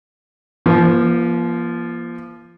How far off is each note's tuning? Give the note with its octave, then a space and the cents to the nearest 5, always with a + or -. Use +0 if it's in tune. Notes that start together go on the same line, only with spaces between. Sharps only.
F3 -25 A#3 +35